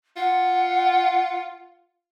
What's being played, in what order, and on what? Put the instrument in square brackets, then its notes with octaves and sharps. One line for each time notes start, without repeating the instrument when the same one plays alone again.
[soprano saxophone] F4 [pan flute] F#5